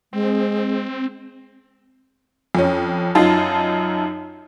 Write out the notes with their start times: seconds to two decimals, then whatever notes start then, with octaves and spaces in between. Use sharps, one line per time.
0.13 G#3 C4
2.55 F2 C#4
3.15 F#2 D#4 F4 A5